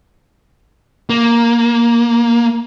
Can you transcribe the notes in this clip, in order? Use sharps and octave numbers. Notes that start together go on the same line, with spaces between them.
A#3